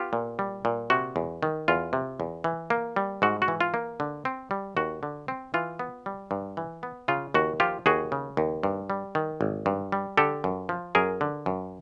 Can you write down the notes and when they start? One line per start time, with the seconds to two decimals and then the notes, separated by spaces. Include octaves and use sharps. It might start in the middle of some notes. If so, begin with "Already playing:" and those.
Already playing: B3 F4 G4
0.13 A#2
0.39 G3
0.65 A#2
0.90 C3 F#4
1.16 E2
1.43 D#3
1.68 E2 F4
1.93 C3
2.20 E2
2.44 E3
2.70 A#3
2.96 G3
3.22 G#2 F#4
3.42 F#4
3.48 E3
3.61 F4
3.74 A#3
4.00 D3
4.25 C4
4.51 G3
4.77 D#2 F#4
5.03 D3
5.28 C4
5.54 E3 F4
5.79 B3
6.06 G3
6.31 G2
6.57 E3
6.83 B3
7.08 C#3 F4
7.34 D#2 F#4
7.60 F3 F4 G4
7.86 D#2 F#4 G#4
8.12 C#3
8.37 D#2
8.63 G2
8.90 G3
9.15 D#3
9.41 G#1
9.66 G2
9.92 G3
10.17 D3 G4 A4
10.44 F#2
10.69 F3
10.95 F#2 G#4 A#4
11.21 D3
11.46 F#2